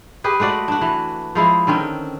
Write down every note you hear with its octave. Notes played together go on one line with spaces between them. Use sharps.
G4 G#4 B4
G#3 A3 F#4 D5
D4 F#4
E3
F3 G#3 E4
D3 D#3 C4 C#4